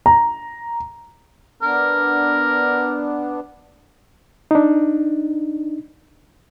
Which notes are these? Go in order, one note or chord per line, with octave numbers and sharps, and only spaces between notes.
A#5
B3 D4 A#4
D4 D#4